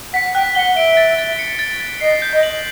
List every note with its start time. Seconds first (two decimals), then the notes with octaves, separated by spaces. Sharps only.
0.13 F#5 B6
0.35 G5 F#6
0.55 F#5 G7
0.76 E5 D7
0.97 A6
1.18 A6
1.39 C#7
1.59 A6
1.80 A6
2.01 D#5 C7
2.22 G6
2.33 D#5
2.43 F#7